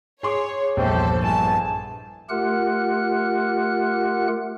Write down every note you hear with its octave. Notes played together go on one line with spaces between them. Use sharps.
G#4 C#5 C6 D6
A#1 E2 G2 G4 A4 C5
E2 G2 G#5 A5
A3 F4 G4 A#4 F#5 F#6